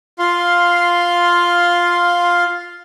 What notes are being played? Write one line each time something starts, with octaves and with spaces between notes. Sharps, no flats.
F4 F5 C6